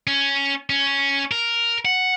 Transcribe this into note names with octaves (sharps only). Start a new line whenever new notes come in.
C#4
C#4
A#4
F#5